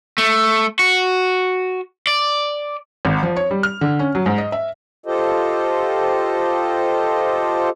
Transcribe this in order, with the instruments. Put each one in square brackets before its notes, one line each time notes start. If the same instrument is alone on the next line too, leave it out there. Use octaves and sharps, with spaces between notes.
[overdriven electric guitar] A3
F#4
D5
[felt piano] G#1
F3
C#5
G3
F6
D3
C#4
F#3
G#2
D#5
E5
[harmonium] F4 G4 A4 C5 D#5